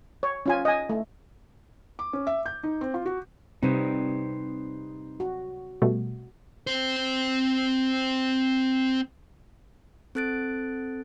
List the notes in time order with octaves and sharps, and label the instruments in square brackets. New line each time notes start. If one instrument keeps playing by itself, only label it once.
[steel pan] C#5
C#4 F4 G#5
D#5 G#5
A3
[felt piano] D6
C#4
E5
G6
D#4
C4
F4
F#4
[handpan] C3 G3 C4 [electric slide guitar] D#4 B4 C5
[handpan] F#4
[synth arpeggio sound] B2 G3 A3
[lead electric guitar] C4 C5
[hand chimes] C4 A4 F#6 A6 D7